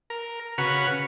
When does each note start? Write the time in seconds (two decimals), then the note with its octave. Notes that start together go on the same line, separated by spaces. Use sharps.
0.10 A#4
0.58 C#3 F#4 B4 C#6 F6